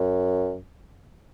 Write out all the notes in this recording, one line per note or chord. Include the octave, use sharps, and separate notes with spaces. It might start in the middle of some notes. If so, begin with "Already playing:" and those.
Already playing: F#2